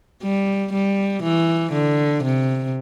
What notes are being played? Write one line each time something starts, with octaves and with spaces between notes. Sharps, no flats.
G3
G3
E3
D3
C3